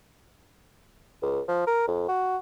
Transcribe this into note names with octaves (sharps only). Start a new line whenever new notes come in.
C#2
F3
A#4
F2
F#4